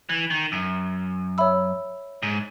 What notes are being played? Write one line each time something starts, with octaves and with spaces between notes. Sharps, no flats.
E3
D#3
F#2
C#5 E5 B5 E6
G#2